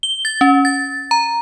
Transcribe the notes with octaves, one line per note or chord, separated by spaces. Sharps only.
G7
A6
C#4
A6
A#5